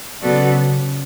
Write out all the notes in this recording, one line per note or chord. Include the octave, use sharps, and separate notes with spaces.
C#3 F#3 B3 F#4 A4 D5